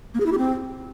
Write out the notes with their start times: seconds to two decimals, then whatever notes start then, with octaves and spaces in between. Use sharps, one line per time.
0.14 A#3
0.20 G#4
0.26 E4
0.32 G4
0.38 C4